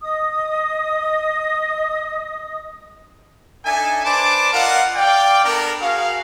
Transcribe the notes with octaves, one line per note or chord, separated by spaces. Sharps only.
D#5 D#6
D4 D#4 A4 E5 G#5
D4 B4 C5 D5 A5 D6
F4 A#4 D5 D#5 F5 F#5
D5 F5 G5
B3 D4 A4 A#4
F#4 G#4 A#4 F5